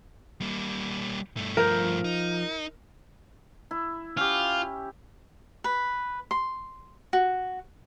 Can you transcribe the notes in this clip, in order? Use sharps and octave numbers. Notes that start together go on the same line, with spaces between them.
G3 A#3
G2 A3
F3 A#4 G6
D#4
E4
C#4 F4 G4
B4
C6
F#4